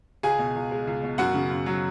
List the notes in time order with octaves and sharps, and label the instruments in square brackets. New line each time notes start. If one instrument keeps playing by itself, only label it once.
[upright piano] C#2 G#4 G#5
B2
C#2
G#3
C#2
B2
F#2 F#4 F#5
C#3
F#2
F#3